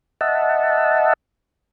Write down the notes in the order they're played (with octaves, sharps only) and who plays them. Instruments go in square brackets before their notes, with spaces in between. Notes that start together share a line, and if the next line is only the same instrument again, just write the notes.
[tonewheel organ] D#5 E5 F#5 A5